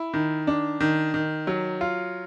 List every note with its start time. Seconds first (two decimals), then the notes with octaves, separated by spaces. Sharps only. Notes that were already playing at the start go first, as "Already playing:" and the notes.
Already playing: E4
0.14 D#3
0.47 D4
0.80 D#3
1.14 D#3
1.47 F#3
1.81 F4